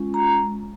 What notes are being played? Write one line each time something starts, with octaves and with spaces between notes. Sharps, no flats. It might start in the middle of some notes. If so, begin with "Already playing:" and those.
Already playing: G#3 C#4 F4
A#5